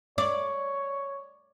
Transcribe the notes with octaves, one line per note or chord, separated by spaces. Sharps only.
C#5 D5